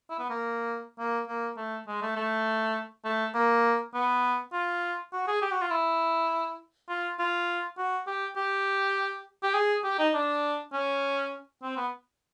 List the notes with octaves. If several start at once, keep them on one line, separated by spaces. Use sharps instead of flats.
E4
B3
A#3
A#3
A#3
A3
G#3
A3
A3
A3
A#3
B3
F4
F#4
G#4
G4
F#4
F4
E4
F4
F4
F#4
G4
G4
G4
G#4
G4
D#4
D4
C#4
C4
B3